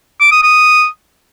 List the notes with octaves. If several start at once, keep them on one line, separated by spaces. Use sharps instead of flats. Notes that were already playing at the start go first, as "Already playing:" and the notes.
D6
D#6
D#6